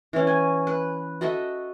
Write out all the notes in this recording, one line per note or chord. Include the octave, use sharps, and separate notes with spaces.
E3 C#4
G#5
B4
F#4 A4 D#5 E5